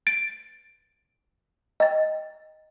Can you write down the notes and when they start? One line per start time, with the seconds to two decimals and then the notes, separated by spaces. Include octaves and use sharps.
0.07 A6 D7
1.80 D#5 G5 A6